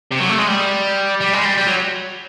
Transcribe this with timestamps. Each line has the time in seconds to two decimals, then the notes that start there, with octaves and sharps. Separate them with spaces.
0.12 C3
0.20 F#3
0.30 A3
0.39 G#3
0.48 G3
1.21 G3
1.33 G#3
1.45 G3
1.57 G3
1.67 F#3